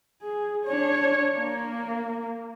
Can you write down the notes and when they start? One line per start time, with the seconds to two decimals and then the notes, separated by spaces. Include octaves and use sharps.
0.22 G#4
0.65 D4 C#5
1.37 A#3